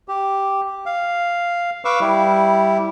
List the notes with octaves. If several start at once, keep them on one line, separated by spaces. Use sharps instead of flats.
G4
F5
B4 F5 C#6 D6 E6
G3 E4